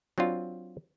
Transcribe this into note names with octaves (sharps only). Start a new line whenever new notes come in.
F#3 C4 D4 F4